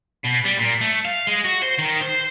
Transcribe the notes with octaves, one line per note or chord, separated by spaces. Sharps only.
B2
G3
A#2
A3
F5
G#3
F#4
C5
D#3
C5